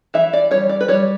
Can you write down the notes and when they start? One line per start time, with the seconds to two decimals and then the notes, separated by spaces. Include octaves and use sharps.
0.14 E3 E5
0.33 D5
0.51 G3 C#5
0.69 D5
0.81 B4
0.88 G3 C#5